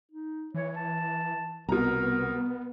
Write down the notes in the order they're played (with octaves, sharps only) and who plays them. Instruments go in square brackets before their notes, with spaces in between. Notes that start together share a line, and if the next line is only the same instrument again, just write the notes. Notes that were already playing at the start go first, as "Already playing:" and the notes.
[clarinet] D#4
[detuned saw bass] E3 [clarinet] C#5
[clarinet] A5
[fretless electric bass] C2 [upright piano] B2 A#5 [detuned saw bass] B3 [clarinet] A#4